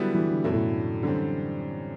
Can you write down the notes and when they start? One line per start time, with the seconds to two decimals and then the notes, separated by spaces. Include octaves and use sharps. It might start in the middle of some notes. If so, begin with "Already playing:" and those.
Already playing: D3 F#3 G3 B3 E4
0.15 E3
0.30 D3
0.44 F#2 B2 D3 A3 E4
0.54 A2
1.02 F#2 D3 E3 G3 C4